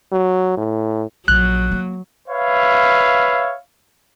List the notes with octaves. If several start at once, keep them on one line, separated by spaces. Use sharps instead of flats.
F#3
A2
A#1 F#3 F#6
A#3
B4 C#5 E5 F5